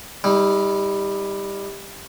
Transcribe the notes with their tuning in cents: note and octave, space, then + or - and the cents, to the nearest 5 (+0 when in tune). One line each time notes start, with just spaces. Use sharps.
G3 +15 D#4 +45